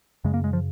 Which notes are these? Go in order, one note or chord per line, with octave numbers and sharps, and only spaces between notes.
F#2 C#3 G#3
A#3
G#3
F3